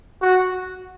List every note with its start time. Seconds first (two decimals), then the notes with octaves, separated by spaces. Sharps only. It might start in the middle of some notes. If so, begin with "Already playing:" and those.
0.22 F#4